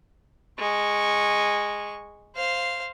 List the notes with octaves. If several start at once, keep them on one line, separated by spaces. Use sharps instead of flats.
G#3 C#6
C5 F5